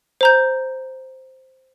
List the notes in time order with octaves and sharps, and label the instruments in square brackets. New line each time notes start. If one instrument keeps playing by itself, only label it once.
[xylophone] C5 A#5 G6